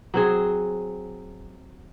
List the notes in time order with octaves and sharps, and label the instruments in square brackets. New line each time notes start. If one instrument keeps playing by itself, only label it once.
[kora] F#3 C4 G#4